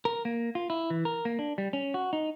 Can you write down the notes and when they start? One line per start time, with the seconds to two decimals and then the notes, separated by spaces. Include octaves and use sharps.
0.05 A#4
0.25 A#3
0.55 F4
0.70 E4
0.90 E3
1.05 A#4
1.25 A#3
1.39 D4
1.58 G3
1.73 C#4
1.94 F#4
2.13 D#4